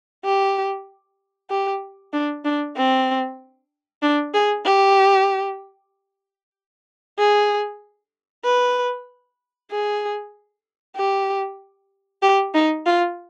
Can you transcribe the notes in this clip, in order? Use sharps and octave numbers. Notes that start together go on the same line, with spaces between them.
G4
G4
D4
D4
C4
D4
G#4
G4
G#4
B4
G#4
G4
G4
D#4
F4